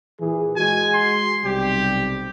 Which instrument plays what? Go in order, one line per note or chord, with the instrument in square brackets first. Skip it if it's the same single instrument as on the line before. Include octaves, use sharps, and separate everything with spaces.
[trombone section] A#2 E3 G#4
[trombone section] G#3 F#4 [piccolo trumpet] G#5
[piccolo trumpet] C6
[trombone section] B1 C3 G3 [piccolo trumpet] G4